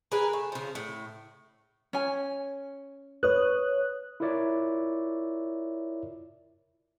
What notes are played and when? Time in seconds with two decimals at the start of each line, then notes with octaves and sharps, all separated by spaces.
0.12 G#4 A#4 B4 G#5
0.33 A3
0.52 C#3 F3
0.75 A2
1.93 C#4 G#5
3.23 B4 C#5 D#6 F#6
4.20 E4 F4 A#4 C#5 D5 E5